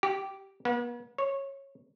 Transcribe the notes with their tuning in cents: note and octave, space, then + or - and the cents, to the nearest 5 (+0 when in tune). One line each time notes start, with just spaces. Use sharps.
G4 -15
B3 -45
C#5 -15